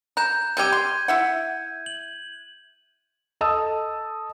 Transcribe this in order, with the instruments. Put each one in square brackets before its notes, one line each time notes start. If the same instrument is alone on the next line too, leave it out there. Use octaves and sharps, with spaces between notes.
[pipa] A#5 [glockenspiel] F#6 G6 E7
[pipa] C3 G3 G4 [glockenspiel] G6 G#6 D#7
[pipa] C6
E4 E5 F#5
[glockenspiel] F#7
[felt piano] A4 D#5 A5 D#6 E6